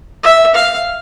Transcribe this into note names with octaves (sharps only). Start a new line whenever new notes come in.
E5
F5